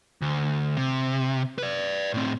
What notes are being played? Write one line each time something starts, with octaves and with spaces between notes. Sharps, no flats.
D2
C3
B4 D5
A2 C4